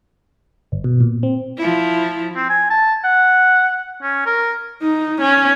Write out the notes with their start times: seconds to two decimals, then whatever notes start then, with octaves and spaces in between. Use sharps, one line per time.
0.72 G1
0.84 B2
1.00 A#2
1.23 C4
1.57 F3 E4
2.36 C4
2.50 G#5
2.70 A5
3.04 F#5
4.02 C#4
4.26 A#4
4.82 D#4
5.21 C#4